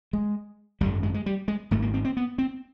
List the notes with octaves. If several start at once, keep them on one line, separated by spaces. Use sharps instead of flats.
G#3
G#1 F#2 D3 G3
G#3
G#3
G3
G#3
G#1 G#2 A3
A#3
C4
C4
B3
C4